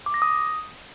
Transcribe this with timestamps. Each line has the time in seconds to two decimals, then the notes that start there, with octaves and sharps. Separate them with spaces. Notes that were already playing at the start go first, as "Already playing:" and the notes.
0.06 D6
0.14 A#6
0.22 D#6